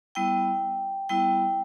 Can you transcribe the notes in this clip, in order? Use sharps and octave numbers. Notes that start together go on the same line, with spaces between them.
G3 B3 E4 G5
G3 B3 E4 G5